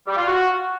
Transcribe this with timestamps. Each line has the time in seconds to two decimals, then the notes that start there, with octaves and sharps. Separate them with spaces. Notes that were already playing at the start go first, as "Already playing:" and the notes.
0.07 G3
0.17 F4
0.27 F#4